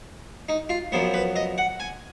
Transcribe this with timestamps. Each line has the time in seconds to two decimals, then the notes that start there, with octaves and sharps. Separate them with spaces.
0.49 D#4
0.69 F4
0.92 F#2 F3 B3
1.14 B4
1.36 D#5
1.58 F#5
1.80 G#5